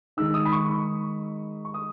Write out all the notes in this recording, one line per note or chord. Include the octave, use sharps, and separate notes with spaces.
D#3 G#3 D#4 E6
D#6
B5
C#6
C#6
C#6
D#6